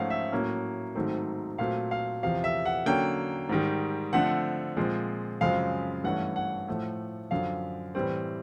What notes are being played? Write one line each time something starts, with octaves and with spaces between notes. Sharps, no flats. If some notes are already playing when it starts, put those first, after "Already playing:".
Already playing: G#2 F3 A3 C#4 F5 F#5
E5
A2 F#3 A#3 C#4
G#2 D#3 F#3 A3 C4
A#2 F#3 A3 C4 F5
F5
E2 C3 F3 F5
E5
F#5
D3 F#3 A#3 C#4 G5
G#2 D#3 G3
D3 F3 A3 C4 F#5
A#2 F3 G#3 C4
F#2 C#3 F3 G#3 C4 F5
G2 E3 A3 C#4 F#5
F#5
A2 F3 A3
F#2 D3 F3 F5
A2 E3 G3 C4